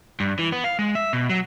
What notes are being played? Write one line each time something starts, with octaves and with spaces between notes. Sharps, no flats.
G2
E3
B3
F5
G#3
E5
B2
F#3